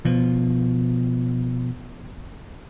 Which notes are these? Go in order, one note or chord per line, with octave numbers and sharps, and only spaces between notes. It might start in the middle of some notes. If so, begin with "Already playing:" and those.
B2 F3